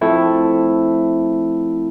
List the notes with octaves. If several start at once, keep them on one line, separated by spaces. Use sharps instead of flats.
F3 A3 C4 E4 A4